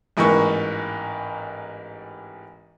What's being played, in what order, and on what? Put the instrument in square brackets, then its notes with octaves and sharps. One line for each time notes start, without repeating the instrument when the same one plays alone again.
[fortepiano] A1 G#2 E3 A#3 C#6